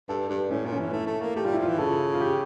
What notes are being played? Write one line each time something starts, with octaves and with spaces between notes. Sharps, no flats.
G2 A4
G2 D4
A2 C#4
A#2
C#4
E3
A3 E4
A3
A#3
A3 G4
G3 F4
F3 E4
F4
E3
C#3 A4
F4
G4